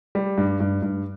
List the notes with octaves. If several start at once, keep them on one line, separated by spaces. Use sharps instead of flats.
G3
G2
G2
G2